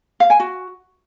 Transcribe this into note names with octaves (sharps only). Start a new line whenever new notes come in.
F5
G#5
F#4